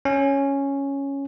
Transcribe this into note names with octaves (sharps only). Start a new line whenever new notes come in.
C#4